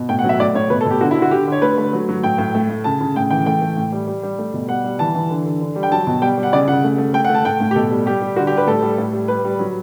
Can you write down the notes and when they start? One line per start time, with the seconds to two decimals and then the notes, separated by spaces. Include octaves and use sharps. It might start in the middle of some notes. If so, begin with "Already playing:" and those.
Already playing: B2
0.09 A2 G5
0.19 F#5
0.24 F#3
0.29 E5
0.39 A2 D5
0.55 A2 C#5
0.70 B2 B4
0.81 A4
0.86 B2 G4
1.01 D3 F#4
1.11 E4
1.17 D3
1.22 F#4
1.31 D3 G4
1.47 D3 C#5
1.62 A3 B4
1.78 A3
1.93 F#3
2.09 F#3
2.23 A2 G5
2.38 A2
2.55 A3
2.69 A3
2.84 C#3 A5
3.01 C#3
3.16 A2 G5
3.30 E3 G5
3.46 A3 G5
3.62 A3
3.77 A2
3.92 G3
4.07 G3
4.23 G3
4.38 A3
4.53 B2
4.68 G3 F#5
4.84 G3
4.99 E3 A5
5.15 E3
5.30 D3
5.46 D3
5.61 D3
5.76 G3
5.83 G5
5.91 F#3 A5
6.07 B2
6.22 G3 G5
6.38 G3
6.43 F#5
6.53 C#3 D5
6.68 C#3 F#5
6.84 A3
6.98 A3
7.14 A3 G5
7.25 F#5
7.29 A3
7.34 A5
7.45 A2 G5
7.60 A2
7.71 G4
7.75 B2 A4
7.91 G3
8.06 G3 G4
8.22 G3
8.36 D3 F#4
8.47 G4
8.52 G3
8.57 B4
8.67 A2 A4
8.82 G3
8.98 A2
9.13 G3
9.28 G3 B4
9.44 G3
9.59 F#3